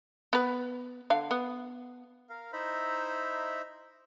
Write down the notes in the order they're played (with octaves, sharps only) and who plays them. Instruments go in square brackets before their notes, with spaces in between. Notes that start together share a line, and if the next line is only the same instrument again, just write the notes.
[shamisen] B3 B4
D3 F5
B3
[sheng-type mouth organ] A#4 F5
D#4 E4 C5 E5 A#5 B5